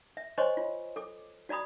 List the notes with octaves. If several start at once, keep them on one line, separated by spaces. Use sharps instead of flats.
E5
C5 C#5 D#5 G#5 C6 C#6
F4
A4 D6
F#4 D5 A#5 B5 D#6